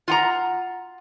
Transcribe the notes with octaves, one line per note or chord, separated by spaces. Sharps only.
F4 F#5 A#5